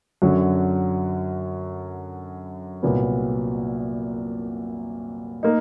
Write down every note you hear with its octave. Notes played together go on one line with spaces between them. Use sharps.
F#2 D3 F#3
C2 A#2 F#3 B3
A#3 D#4